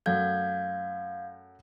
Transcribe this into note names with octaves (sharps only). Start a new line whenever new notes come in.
F#2 A3 F5 G6 G#6